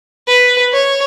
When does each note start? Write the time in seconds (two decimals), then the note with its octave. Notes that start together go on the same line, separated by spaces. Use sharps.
0.28 B4
0.72 C#5